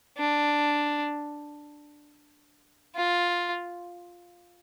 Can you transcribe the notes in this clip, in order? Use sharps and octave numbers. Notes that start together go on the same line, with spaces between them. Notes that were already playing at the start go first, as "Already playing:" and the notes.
D4
F4